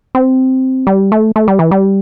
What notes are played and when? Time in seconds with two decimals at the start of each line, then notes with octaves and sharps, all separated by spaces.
0.15 C4
0.87 G3
1.12 A3
1.36 A3
1.48 G3
1.59 E3
1.71 G3